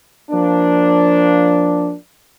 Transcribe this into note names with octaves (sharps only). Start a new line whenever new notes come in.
F3 A#3 D4